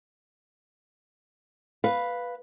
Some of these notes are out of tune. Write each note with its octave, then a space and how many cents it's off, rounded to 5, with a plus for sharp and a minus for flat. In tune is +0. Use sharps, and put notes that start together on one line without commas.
B4 +0 F5 +5